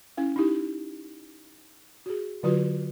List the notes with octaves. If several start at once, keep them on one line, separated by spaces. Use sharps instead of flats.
C#4 E4 F5
D#4 E4 G4
F#4 G#4
D3 F#3 F4 F#4 B4